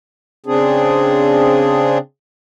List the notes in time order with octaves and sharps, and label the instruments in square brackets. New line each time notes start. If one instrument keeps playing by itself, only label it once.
[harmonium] C#3 C4 D4 G#4